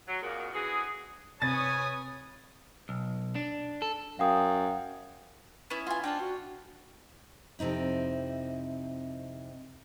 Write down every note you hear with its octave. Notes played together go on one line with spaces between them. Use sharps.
F#3
F2 A#2 A#3 F#4 G#4 A#4
D3 E3 F#4 G#4
C3 C4 B4 C#5 G#5 D#6 A6
B1
D4
A4
F#2 F5 G5 D#6
B3 C#4 E4
F4 G#5
C4 D4 F4 F#5 G5
F#4
F2 C3 C4 D#4 E4